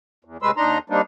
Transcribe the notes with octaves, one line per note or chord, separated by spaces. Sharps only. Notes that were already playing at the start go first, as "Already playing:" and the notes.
E2
A2 C3 G#3 B4 C6 E6
D#2 D4 D#4 A#5 C6
G3 A#3 C4 D4 D#4